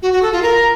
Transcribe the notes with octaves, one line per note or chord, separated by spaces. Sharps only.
F#4
F#4
A4
F4
A#4